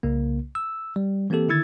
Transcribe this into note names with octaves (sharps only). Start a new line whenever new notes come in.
C2 C#3 A#3
E6
G3
E3 A#3 C4 G4 A4
D3 D#3 E4 E6 G#6 A6